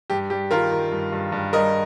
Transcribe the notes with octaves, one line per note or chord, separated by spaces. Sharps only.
G2 G4
G3 G4
D#3 F4 A#4
D#3
G2
G2
G2
G3 A#4 D#5